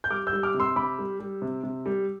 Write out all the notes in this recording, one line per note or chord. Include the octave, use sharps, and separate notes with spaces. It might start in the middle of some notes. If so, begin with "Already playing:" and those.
G6
G3 D6 F6
E6 G6
G3
D6 F6
C3
C6 E6
C3 B5 D6
G3
G3
C3
C3
G3